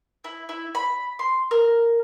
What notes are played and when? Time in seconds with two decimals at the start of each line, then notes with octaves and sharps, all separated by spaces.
0.24 E4
0.49 E4
0.75 B5
1.19 C6
1.51 A#4